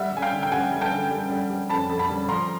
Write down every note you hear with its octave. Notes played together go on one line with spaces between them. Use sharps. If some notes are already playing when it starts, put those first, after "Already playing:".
Already playing: G3 E5 F#5
G3 G#5
F5 G5
D3
G5
G3 F#5 G#5
G3
G5 A5
D3
G3
G3
G3
F2 A5 B5
F2
A5 B5
G3
F3 A#5 C6